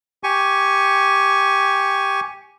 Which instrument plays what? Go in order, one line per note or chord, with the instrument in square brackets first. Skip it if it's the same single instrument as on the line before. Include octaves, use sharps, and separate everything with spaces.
[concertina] G4 G#5 C#6